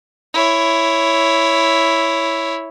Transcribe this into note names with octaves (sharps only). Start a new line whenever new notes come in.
E4 C#5